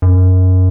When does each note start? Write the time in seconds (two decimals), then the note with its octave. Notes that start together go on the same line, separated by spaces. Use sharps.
0.02 F#2